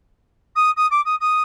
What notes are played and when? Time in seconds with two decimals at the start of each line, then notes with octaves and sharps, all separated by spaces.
0.55 D#6
0.76 D#6
0.91 D6
1.05 D#6
1.20 D#6